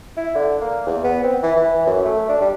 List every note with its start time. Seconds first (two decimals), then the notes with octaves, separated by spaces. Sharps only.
0.17 E4
0.35 D3
0.61 A#3
0.86 E2
1.04 B3
1.23 C4
1.43 E3
1.56 E3
1.87 F#2
2.05 A3
2.29 D4
2.41 G3